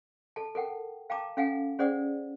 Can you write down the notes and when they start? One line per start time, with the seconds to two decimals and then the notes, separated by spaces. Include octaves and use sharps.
0.36 A4 A5
0.55 A4 A#4 F#5 G5
1.10 F5 G5 A5 A#5 D6
1.37 C#4 A4 F5 F#5 G#5
1.79 C#4 G#4 C5 D5 F#5 D#6